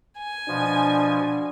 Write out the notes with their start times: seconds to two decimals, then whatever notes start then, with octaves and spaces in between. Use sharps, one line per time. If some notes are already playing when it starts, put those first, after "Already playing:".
0.18 G#5
0.48 B2 F3 D4